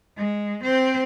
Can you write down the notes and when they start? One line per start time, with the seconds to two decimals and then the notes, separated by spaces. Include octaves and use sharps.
0.17 G#3
0.63 C4 C5